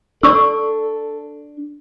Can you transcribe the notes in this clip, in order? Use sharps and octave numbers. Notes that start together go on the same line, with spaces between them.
D4 A4 D5 C#6 E6